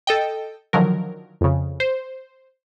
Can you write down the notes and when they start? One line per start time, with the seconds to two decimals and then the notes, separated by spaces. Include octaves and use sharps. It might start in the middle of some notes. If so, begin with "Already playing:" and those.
0.07 A4 D#5 G5
0.73 D3 D#3 F3 F#3 A#4
1.41 F2 C#3
1.80 C5